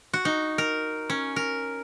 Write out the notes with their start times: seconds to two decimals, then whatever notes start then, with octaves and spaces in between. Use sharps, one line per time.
0.13 F#4
0.25 D#4
0.58 A#4
1.10 C#4
1.36 A#4